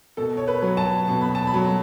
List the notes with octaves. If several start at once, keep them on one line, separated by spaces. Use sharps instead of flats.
B2 A4
C#5
B4
F#3
A5
B2
B5
A5
B5
F#3